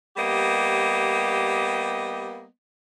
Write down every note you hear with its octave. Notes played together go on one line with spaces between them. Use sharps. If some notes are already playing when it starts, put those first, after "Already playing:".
G3 A#3 B3 G4 D#5